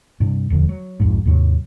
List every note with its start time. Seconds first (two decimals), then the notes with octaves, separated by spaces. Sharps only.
0.20 G2 C3
0.50 D1 E2 D3 F3
0.69 F#3
1.00 B1 F2 G#2
1.25 D#2 G#2 C3 F#3